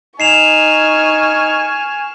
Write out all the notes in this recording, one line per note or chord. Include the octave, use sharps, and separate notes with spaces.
D#4 G#5 C#6 F6 C7 E7 F7